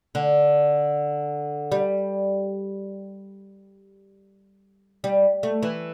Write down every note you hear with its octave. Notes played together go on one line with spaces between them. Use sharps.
D3
G3
G3
A3
E3